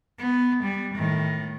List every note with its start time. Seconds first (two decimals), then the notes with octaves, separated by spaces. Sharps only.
0.19 B3
0.63 G3
0.94 A2 D#3